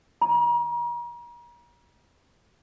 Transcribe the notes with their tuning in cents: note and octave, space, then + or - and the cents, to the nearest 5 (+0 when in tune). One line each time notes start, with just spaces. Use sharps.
A#5 +40